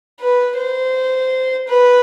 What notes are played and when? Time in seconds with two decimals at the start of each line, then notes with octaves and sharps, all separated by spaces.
0.20 B4
0.57 C5
1.68 B4